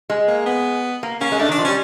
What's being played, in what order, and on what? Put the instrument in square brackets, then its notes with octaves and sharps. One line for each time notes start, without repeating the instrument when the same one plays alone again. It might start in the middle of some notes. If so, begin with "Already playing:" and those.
[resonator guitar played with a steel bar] G#3
[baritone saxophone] A#3
B3
[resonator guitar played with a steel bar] A#3
[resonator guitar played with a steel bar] A#3 [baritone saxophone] C#4
[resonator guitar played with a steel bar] G#3
[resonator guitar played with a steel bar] A3 [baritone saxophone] D4
[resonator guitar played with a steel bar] D#3
[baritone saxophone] D4
[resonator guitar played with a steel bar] F3
[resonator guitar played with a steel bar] G3 [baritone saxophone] C#4